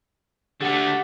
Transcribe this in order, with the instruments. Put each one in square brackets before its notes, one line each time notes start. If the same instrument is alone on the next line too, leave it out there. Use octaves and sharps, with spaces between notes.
[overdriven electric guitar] D3 A3 [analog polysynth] G4 F#5